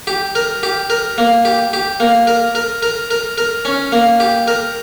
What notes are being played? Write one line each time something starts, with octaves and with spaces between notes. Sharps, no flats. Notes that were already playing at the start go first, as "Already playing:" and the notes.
G4
A#4
G4
A#4
A#3
G4
G4
A#3
A#4
A#4
A#4
A#4
A#4
C#4
A#3
G4
A#4